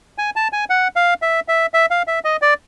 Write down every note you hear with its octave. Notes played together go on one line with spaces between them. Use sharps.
G#5
A5
G#5
F#5
F5
E5
E5
E5
F5
E5
D#5
D5